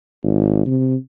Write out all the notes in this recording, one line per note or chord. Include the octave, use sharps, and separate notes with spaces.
G#1
C3